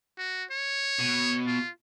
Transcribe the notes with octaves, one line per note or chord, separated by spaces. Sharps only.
F#4
C#5
B2
F4